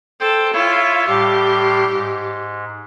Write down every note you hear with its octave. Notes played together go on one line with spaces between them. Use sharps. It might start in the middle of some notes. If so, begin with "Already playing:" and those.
A4 C5 G5
E4 F4 C#5 E5
A2 G3 G4 C6
G#2